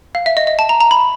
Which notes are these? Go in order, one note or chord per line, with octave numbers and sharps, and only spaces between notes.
F5
E5
D#5
D#5
A5
A#5
A#5
B5